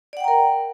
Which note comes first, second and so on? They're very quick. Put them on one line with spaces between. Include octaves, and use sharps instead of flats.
D5 F#5 G5 A#5 A#4